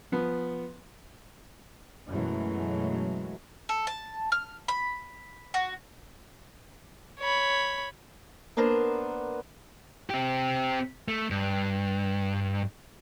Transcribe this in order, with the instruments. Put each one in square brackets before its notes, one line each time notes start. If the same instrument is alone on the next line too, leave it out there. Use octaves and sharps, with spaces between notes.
[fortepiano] F3 B3
[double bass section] F#2 B2 E3 F#3 G#3 A3
[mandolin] A4
A5
F6
B5
F#4
[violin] C#5 B5
[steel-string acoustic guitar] A#3 B3 D4 A#4 C5
[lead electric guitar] C4 G4
A3
G2